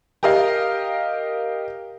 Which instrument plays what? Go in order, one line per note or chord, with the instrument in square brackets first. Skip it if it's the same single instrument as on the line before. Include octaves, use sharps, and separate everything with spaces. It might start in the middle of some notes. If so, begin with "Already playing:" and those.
[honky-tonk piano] G4 A#4 D#5 F5